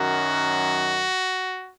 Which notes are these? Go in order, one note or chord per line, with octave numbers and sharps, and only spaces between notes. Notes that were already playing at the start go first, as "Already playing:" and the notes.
Already playing: F#2 D#3 F#3 F#4